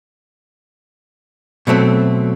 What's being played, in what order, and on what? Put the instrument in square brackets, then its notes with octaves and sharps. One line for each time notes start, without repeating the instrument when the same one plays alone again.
[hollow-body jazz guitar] B2 F#3 A3 C4